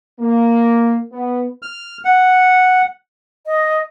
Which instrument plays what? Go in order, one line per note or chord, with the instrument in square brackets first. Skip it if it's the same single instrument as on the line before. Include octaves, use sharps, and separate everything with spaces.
[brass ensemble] A#3
B3
[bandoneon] F6
F#5
[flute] D#5